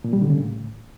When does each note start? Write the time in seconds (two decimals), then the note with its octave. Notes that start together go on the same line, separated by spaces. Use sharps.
0.04 A#2
0.13 G3
0.22 D3
0.30 C#3
0.39 A2